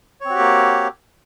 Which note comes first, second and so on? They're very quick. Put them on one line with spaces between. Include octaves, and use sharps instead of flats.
C#5 C4 F#4 G4 A#3